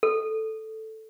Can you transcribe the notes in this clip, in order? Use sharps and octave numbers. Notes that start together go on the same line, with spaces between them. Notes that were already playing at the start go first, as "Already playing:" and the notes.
A4